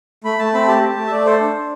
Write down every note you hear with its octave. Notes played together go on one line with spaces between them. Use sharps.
A3 B5
A3 A5
C4 B5
G4 A5
A3
A3
E5
A3 D5
A4 C5
D4
D4